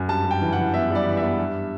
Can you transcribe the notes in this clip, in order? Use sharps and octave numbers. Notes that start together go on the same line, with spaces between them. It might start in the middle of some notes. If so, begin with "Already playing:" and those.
Already playing: F#2
G2 A5
G2
G5
E3
F#5
E3
B3 E5
G3 D5
E3
E5
B3
G2